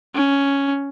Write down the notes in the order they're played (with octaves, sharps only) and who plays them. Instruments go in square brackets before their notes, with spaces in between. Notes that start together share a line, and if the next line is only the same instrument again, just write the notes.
[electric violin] C#4